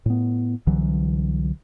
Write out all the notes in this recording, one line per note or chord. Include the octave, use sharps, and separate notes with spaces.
A2 B3
C2 D3 E3 F#3